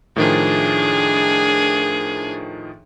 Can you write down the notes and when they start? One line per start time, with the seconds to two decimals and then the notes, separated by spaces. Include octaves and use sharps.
0.16 A2 D#3 F3 D4 G#4